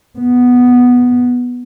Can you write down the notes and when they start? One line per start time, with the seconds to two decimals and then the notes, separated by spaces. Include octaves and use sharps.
0.19 B3